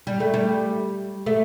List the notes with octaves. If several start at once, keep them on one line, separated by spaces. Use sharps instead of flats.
G3
A3
G3
A3